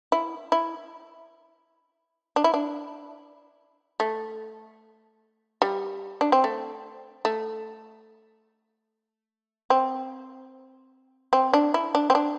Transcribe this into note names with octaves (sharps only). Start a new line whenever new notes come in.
E4
E4
D4
E4
D4
A3
G3
D4
C4
A3
A3
C4
C4
D4
E4
D4
C4
D4